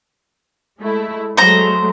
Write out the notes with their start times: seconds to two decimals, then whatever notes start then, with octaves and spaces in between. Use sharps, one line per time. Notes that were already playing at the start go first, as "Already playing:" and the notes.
0.79 G#3 A3 E4
1.37 F#3 G#3 A3 C5 A#5